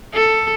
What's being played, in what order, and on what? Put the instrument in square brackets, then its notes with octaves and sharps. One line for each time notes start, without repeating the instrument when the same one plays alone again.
[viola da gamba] A4